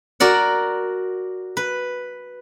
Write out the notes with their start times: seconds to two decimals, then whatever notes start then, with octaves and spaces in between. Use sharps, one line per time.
0.20 F#4 A#4 D5 F#5
1.57 B4